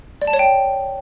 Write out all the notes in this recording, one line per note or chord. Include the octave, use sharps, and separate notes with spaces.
D5
A5
C#5
G5